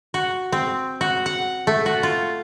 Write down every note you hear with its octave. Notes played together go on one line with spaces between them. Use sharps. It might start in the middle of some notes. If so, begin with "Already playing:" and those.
F#4
C4
F#4
F#5
A3
F#4
F4